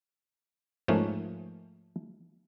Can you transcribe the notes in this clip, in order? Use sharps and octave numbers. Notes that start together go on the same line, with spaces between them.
G#2 F3 A3 A#3 C#4